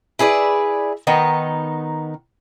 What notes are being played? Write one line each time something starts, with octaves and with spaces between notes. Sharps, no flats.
E4 G#4 B4 D5
D#3 B3 D#4